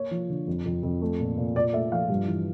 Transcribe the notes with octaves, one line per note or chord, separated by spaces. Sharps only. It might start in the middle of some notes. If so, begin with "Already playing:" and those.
Already playing: A#3 C#5
F3
D3
F2
F2
F2
A3
A#2
A#2
A#2 D5
A3 E5
F3 F5
G2
E3